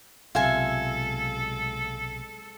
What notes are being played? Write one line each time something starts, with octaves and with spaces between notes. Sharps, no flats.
B1 C3 G#3 F4 A4 E5 G#5